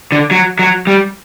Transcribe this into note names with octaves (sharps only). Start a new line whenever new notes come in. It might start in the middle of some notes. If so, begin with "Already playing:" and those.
D3
F#3
F#3
G3